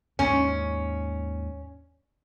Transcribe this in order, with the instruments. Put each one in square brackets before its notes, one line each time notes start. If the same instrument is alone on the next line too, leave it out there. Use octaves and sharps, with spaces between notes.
[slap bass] D#2 G#2 [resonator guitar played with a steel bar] C#4